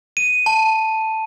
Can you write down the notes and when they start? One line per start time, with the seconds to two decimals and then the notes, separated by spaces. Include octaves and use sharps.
0.17 D#7
0.46 A5